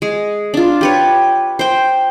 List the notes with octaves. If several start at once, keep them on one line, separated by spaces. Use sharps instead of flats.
G#3
D4 F4
G4 B4 C#5
C5 G5